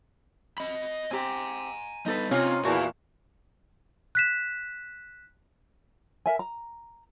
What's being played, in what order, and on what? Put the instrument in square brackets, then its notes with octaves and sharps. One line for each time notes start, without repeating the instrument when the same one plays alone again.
[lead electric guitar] D#5 B5
[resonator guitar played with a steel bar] C4 G4 [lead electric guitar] G#5 A#5
[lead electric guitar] G3 B3 [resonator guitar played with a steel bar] D#4 A4 B4
[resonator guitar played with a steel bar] C3 C#4 D#4 [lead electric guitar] C4 C#5 [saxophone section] F4
[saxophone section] E2 A#2 [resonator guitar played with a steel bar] F#4 A5 [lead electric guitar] E5 G#5
[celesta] F#6 B6 E7
[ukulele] A#4 E5 G#5
A#5